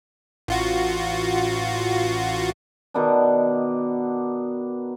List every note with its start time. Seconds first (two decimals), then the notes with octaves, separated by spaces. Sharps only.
0.48 A1 F4 F#4
2.94 B2 D#3 B3 D4